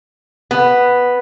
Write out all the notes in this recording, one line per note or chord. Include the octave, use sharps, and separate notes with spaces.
B3